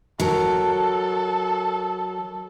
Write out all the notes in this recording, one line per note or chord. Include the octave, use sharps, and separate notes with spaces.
F#3 A4 A#4